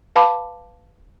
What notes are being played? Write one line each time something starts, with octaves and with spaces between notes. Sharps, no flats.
B4 F5 A5 B5 D6